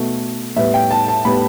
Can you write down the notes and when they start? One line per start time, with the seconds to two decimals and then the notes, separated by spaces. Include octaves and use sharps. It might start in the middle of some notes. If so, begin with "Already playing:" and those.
Already playing: B2 A3
0.56 A2 G3 B3 E5
0.74 G5
0.91 A5
1.08 A5
1.25 A2 G3 B3 B5